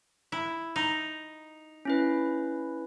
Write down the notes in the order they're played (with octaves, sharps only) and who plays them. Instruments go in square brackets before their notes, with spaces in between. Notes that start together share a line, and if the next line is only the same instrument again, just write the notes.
[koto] E4
D#4
[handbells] C#4 E4 B4